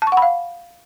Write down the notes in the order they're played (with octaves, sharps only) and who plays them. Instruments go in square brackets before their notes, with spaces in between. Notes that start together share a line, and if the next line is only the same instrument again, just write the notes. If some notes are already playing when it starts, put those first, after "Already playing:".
[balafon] A5
C#6
F#5
B5
F5